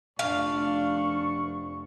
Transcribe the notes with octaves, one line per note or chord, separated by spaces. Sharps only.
F1 D4 F5 C#6